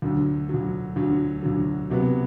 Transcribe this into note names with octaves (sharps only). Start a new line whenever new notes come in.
D2 D3 F#3
D2 D3 F#3
D2 D3 F#3
D2 D3 F#3
C3 F#3 B3